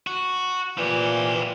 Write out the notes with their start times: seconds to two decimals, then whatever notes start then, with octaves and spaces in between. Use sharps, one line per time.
0.07 F#4
0.78 A#2 E3 F3 G4